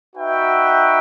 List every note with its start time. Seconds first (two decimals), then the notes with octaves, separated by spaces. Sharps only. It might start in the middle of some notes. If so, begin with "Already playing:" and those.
0.16 D#4 F#4 B4 E5 G5